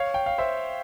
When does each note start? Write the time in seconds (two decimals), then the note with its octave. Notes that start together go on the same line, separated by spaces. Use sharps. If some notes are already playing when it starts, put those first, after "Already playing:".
Already playing: C#5 F5
0.14 G5
0.26 F5
0.38 C5 E5